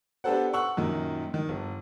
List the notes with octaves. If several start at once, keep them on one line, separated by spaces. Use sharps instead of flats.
B3 D4 G4 A4 C5 F#5
F#5 C#6 E6 F#7
F#2 A#2 D#3
D#3
G1